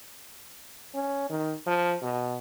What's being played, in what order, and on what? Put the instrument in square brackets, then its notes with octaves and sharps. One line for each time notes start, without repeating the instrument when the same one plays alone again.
[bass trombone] C#4
D#3
F3
B2